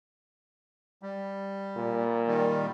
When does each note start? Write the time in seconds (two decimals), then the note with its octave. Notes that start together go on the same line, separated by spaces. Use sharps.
1.02 G3
1.76 A#2
2.27 D#3 G3